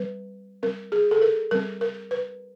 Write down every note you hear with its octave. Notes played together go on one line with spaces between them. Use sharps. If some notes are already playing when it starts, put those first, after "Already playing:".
Already playing: G3 C4 B4
G3 C4 A#4
G#4
A4
A#4
G3 C4 A#4
A#4
B4